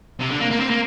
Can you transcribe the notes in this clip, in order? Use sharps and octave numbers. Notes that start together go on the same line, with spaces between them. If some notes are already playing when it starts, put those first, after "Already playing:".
C3
D3
A#3
A#3
C4
A#3